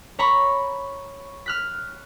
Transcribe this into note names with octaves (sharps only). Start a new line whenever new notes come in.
C#5 A#5 B5 C#6
F6 F#6 B6